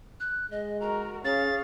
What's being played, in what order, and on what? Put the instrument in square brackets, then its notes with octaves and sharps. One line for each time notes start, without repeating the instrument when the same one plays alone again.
[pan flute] F#6
[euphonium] G#3 [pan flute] D#5
[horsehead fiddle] F#4 A#4 [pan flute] A#5
[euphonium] C#4 [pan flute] G#4 [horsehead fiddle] C#5 F5 [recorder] A6